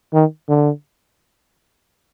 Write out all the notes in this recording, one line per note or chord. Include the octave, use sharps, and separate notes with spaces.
D#3
D3